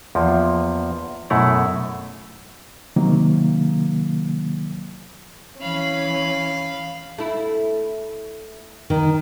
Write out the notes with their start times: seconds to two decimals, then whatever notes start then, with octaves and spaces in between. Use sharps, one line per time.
0.15 E2 F3 A#3
1.30 F#2 B2 A3 E4 F#5 A#5
2.96 C3 D#3 F#3 A#3
5.61 E3 C#4 F5 B5
7.18 A3 E4
8.90 D#3